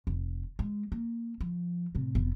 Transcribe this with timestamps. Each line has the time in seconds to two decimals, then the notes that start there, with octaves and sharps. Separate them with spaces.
0.07 F1
0.59 G#3
0.92 A#3
1.40 F3
1.95 A2 C3
2.15 F1 B3